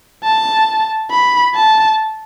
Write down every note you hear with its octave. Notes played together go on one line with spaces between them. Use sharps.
A5
B5
A5